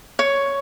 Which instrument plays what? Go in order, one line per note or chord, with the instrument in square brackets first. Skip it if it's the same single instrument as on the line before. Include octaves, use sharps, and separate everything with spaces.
[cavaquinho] C#5